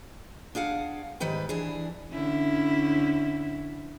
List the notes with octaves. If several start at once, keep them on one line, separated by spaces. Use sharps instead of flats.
D4 G#4 F5 F#5
G#2 D#3 G3 B4 G5
E3 D4 G#4
D3 C#4 E4